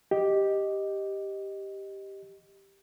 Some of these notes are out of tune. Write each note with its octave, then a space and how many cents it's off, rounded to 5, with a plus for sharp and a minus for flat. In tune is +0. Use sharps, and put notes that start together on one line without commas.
G4 +0 D#5 +0